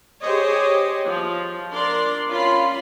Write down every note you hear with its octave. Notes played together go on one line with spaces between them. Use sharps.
G4 G#4 C5 C#5 D#5
F3
D4 A#4 D5 C6
C#4 F4 B5 C6